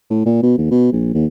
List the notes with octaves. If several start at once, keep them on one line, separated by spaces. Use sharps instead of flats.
A2
A#2
B2
D#2
B2
A#1
D#2